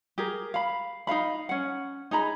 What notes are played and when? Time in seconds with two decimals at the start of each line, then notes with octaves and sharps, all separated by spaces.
0.18 G4 G#4 A#4
0.54 F5 B5
1.07 D#4 F#4 F5 B5
1.49 C#4 F#5
2.11 D#4 G#4 A#5 B5